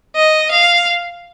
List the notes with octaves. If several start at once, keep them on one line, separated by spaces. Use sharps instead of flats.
D#5
F5